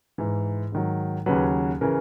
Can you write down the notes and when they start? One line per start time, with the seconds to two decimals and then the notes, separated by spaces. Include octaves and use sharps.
0.18 G#2 E3
0.72 G#2 D#3 F#3
1.26 D#2 C#3 F#3 B4
1.81 C#3 E3 A#4